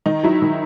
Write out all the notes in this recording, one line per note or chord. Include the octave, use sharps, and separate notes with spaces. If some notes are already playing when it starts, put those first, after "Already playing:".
D#3 D#4
F#3 E4
D#3